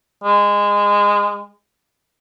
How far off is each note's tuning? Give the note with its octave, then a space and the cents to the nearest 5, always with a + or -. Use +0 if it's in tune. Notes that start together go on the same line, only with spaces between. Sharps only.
G#3 -20